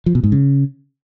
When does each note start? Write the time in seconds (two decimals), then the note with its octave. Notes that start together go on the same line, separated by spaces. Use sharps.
0.06 F3
0.15 B2
0.24 G#2
0.32 C#3